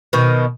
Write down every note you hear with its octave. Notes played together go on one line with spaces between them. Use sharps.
B2 D#3